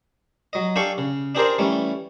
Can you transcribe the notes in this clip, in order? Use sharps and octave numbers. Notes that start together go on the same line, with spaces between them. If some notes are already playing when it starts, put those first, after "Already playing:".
F#3 D#5
D4 G4 A4 F5 G#5 C#6
C#3
D4 G4 G#4 A#4 C5 D5
E3 G3 A3 C#4